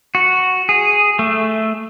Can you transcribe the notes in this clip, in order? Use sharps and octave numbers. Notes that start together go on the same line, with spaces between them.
F#4
G#4
A3